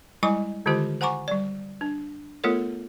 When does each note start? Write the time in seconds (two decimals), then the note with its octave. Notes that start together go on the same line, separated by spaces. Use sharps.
0.23 G3 G#3 E4 D#5 G#5 D6
0.66 D3 D#3 G#3 F4 G4 C5
1.01 C5 F#5 G#5 A#5 C#6 D6
1.28 G3 D5
1.81 D4
2.44 A3 B3 F4 A4 A#4 C#5